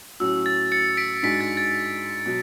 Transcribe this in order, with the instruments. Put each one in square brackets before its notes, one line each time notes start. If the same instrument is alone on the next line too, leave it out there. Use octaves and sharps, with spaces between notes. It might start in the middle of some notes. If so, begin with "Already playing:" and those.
[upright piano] A2 F#3 C#4 F#4 [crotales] E6
[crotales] A6
A6 C#7
B6 D7
[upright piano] G#2 G#3 D4 F#4 [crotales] B6
[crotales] A6
A6
[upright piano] B2 F#3